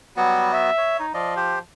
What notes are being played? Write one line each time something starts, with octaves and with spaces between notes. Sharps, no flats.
F#3 G3 B3 F#4
E5
C#5
D#4
F3 D5 D#5
G4 C5